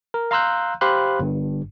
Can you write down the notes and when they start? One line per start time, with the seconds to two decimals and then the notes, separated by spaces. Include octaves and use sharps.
0.14 A#4
0.31 F5 A#5 C6 E6 F#6 G6
0.81 G4 C5 F5 B5 C6 F#6
1.19 G1 G2